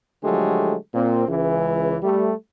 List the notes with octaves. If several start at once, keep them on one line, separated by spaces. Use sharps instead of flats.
D3 F3 F#3 G#3 A3 G4
A#2 C4
C#2 E3
G3 A3